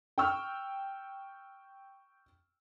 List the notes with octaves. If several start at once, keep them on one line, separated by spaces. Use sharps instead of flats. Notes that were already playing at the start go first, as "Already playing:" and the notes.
G5 C#6 E6 F6